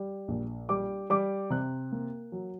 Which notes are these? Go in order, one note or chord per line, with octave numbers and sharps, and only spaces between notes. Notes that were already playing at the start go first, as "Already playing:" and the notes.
Already playing: G3
A#1
G3 D6
G3 D6
C3 F#6
A#3
F#3